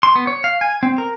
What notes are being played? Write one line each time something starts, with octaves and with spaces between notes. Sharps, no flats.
C6
B3
C#5
F5
G#5
C4
A#4